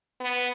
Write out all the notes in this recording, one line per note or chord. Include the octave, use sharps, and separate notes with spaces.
B3